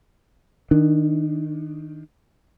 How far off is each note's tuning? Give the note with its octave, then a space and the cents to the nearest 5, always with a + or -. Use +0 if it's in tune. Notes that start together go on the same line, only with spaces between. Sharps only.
D#3 +10 D4 +25